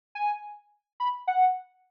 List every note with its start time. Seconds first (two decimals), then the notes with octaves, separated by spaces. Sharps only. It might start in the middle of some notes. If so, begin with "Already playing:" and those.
0.15 G#5
1.00 B5
1.27 F#5